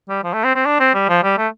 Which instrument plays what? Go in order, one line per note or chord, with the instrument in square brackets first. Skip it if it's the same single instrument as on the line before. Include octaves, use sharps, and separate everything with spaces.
[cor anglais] G3
F3
A3
C4
C4
D4
C4
G3
F3
G3
A3